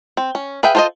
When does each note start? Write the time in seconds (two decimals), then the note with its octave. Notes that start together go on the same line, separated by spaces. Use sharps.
0.17 C4
0.35 C#4
0.63 G#4 B4 E5 F5 G5
0.75 F4 A4 C5 D5 D#5